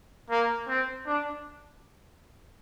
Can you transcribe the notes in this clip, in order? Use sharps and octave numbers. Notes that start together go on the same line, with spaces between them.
A#3
C4
D4